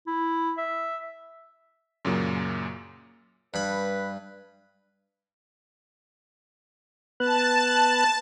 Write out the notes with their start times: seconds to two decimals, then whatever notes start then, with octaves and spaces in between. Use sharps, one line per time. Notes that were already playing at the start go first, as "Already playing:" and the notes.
0.07 E4
0.58 E5
2.05 F#2 A#2 C#3 F#3 A#3
3.54 G2 B4 B5
7.20 B3 B4 A5 F#6